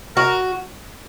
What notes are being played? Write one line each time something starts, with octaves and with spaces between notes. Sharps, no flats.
F#4 A#4